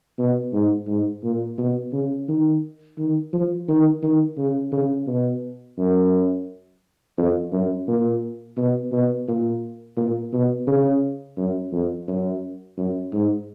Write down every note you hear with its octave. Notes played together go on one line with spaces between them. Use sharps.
B2
G#2
G#2
A#2
B2
C#3
D#3
D#3
F3
D#3
D#3
C#3
C#3
B2
F#2
F2
F#2
A#2
B2
B2
A#2
A#2
B2
C#3
F#2
F2
F#2
F#2
G#2